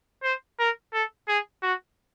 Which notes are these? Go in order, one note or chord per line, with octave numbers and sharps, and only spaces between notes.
C5
A#4
A4
G#4
F#4